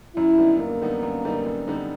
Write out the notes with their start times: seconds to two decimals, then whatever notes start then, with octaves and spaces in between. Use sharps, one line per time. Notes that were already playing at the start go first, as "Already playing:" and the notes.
0.16 F#2 E4
0.38 D3 G3 B3 D#4
0.59 F#2 A#3
0.81 D3 G3 B3 D#4
1.03 F#2
1.24 D3 G3 B3 D#4
1.46 F#2
1.68 D3 G3 B3 D#4